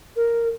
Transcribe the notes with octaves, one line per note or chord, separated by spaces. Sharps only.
A#4